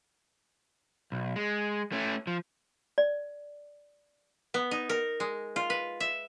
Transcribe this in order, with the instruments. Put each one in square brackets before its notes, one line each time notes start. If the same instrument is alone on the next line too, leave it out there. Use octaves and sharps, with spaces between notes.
[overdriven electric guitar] B1
G#3
A3 C#4
F3
[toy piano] D5
[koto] B3
D#4
A#4
G#3
F4
B4
E5